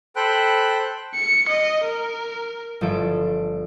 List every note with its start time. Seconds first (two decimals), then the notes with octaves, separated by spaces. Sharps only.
0.16 A4 C5 G5 B5 F#6
1.15 C#7
1.49 D#5
1.85 A#4
2.81 G1 F3 A4 D7